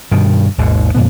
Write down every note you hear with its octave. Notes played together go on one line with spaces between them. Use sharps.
G2 B2 D#3
G#1 D#2 G#2 B2
F2 A#2 D3 B3